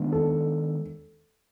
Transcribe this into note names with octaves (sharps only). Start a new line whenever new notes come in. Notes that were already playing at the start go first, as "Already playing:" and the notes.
Already playing: D#3 G#3 B3 D4
A4